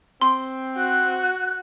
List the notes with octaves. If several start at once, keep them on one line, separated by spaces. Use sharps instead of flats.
C4 C6
F#4 F#6